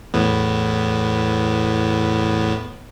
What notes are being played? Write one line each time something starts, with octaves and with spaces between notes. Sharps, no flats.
E2 A2 B3